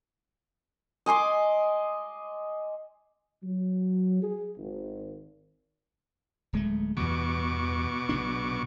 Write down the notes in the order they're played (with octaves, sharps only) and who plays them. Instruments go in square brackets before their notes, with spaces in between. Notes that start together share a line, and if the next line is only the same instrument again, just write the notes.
[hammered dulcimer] D#5 G#5 C6 D6
[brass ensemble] F#3
G#4
G#1
[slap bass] D1 G#3 A3
[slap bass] E2 G2 E3 [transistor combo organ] B2 C#6 D6
[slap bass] B1 C#3 D4